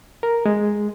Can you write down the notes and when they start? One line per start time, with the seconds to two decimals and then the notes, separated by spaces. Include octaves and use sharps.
0.23 A#4
0.46 G#3